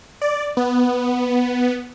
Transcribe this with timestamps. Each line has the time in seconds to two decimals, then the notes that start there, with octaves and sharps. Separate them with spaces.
0.22 D5
0.57 B3